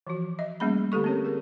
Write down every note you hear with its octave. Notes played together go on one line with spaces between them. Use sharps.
E3 F3 F#4
D#5 E5
G3 A3 A#3 C#4 G#4 B5
D3 A3 G4 A4 C#6
C4 C#4 G4 A#4 C#5
G#4 A#4